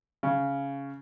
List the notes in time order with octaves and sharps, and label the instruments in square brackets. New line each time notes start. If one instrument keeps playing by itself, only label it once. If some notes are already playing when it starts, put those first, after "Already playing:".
[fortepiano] C#3